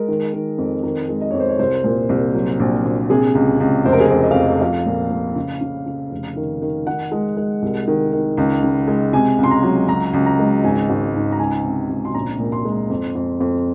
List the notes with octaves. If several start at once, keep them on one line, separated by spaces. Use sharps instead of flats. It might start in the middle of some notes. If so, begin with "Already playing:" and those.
Already playing: G#3 A#4
D#3
D#3
F2
D#3 A#4
G#3
D#5
F2 C#5
C5
C#5
C2 C5
A#2
C2
F#3
A#1
A#1
C3 G#4
C#2
C#2
F1 C5
A#4
G#4
F2 A#4
D#5
F5
F2 D#5
F3 F5
A#2
A#2
C#3
C#3
C#3
F1
D#3
D#3
D#3 F#5
G#3
G#3
C2
D#3
D#3
C#2
C#3
G#3
C3 G#5
C#2
C6
A#5
F#3
C#2 A#5
C#2
A#5
G#3
G#1 G#5
G#1
G#2
A#5
C#2 G#5
C3
C#2
C6
A#1 A#5
A#2
C6
G#3
F2
F2
F2